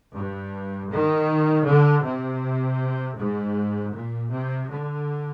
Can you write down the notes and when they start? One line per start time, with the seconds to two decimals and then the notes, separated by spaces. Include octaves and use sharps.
0.14 G2
0.90 D#3
1.66 D3
2.03 C3
3.17 G#2
3.93 A#2
4.31 C3
4.69 D3